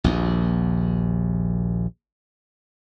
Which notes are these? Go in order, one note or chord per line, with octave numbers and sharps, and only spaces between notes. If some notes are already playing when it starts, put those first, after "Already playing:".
A#1 D#2